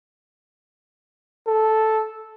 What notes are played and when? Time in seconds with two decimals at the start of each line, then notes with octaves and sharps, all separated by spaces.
1.47 A4